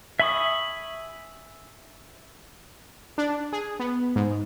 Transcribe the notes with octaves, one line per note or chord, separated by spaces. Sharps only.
E5 G#5 B5 C#6 D#6
D4
G#4
B3
G#2